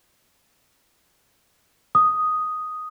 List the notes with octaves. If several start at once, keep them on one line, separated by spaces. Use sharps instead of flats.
D#6